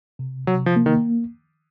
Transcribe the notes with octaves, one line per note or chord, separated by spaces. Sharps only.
C3
C3 F#3
F3
A#3
D#3